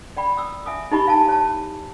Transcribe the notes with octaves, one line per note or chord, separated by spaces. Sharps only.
D5 G5 B5
D#6 E6
E5 G#5 D#6
D#4 E4 G4 D#5 B5 C#6
F5 G#5 A5
C#5 A5